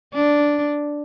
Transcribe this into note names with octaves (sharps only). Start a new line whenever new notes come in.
D4